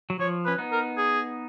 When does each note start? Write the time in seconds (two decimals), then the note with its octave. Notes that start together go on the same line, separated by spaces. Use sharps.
0.10 F#3
0.19 F3 C#5
0.46 C#4 B4
0.58 B3 D#4
0.72 A#4
0.97 G#4